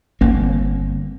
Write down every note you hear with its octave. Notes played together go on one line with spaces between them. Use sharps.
G1 A#3 C4